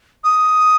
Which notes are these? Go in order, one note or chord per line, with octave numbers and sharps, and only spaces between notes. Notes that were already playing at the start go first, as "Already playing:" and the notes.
D#6